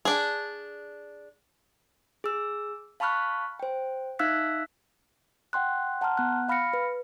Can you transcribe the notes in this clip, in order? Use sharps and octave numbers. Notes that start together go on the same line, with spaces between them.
D4 G#4
G#4 E6
F5 A5 B5 C#6 F6 F#6
C5 G5
D#4 E5 F5 E6 F#6 B6
F#5 G5 C6 F#6
F#5 A5 A#5 C6 F6
B3 F#5 F#6
F5 B5 F6 A#6 C#7
B4